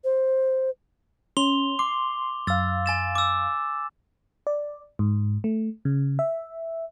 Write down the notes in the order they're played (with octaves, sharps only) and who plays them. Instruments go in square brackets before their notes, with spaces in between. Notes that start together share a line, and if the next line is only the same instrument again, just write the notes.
[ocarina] C5
[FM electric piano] C#4 [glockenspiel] C6 F7 G7
[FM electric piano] C6 [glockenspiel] D6
[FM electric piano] F#2 F5 [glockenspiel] E6 A6
[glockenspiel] G#5 A6 E7
D6 E6
[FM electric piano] D5
G#2
A3
C#3
E5